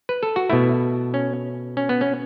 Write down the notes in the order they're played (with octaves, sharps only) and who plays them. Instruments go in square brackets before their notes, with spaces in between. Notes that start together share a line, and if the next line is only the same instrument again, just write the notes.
[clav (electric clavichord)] B4
A4
F#4
B2 A3 E4
C#4
C#4
B3
C#4